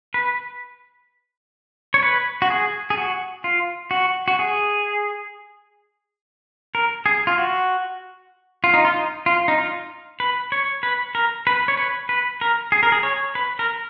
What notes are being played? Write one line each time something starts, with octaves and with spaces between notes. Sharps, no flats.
B4
C#5
B4
F#4
G#4
G#4
F#4
F4
F#4
F#4
G#4
A#4
G#4
F4
F#4
F4
D#4
F4
D#4
F4
D#4
F4
B4
C#5
B4
A#4
B4
C#5
B4
B4
A#4
G#4
A#4
G#4
C#5
B4
A#4